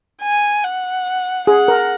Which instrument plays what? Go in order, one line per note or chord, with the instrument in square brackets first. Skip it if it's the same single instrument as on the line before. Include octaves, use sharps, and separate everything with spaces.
[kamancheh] G#5
F#5
[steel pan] G#4 [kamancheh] F#5
[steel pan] A#4